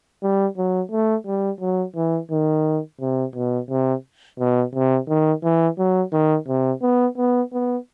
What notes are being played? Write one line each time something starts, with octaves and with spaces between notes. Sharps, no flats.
G3
F#3
A3
G3
F#3
E3
D#3
C3
B2
C3
B2
C3
D#3
E3
F#3
D#3
C3
B3
B3
B3